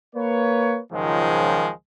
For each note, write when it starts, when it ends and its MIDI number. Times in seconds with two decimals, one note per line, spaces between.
0.16 0.81 58
0.16 0.81 71
0.16 0.81 73
0.92 1.71 37
0.92 1.71 44
0.92 1.71 51
0.92 1.71 53
0.92 1.71 54
0.92 1.71 56